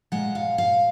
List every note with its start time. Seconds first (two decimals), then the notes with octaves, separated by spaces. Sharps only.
0.12 A#2 G#3 F#5
0.35 F5
0.58 F5